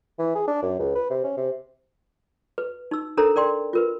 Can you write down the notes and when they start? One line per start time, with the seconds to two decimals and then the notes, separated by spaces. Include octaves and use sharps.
0.19 E3
0.35 G#4
0.48 D4
0.62 F#2
0.79 C#2
0.95 B4
1.10 C3
1.24 C#4
1.37 C3
2.58 B4
2.91 D#4 E6
3.17 D4 A4 A#4 C5 A#5
3.36 A#4 D5 G5 C6
3.73 F4 A#4 B4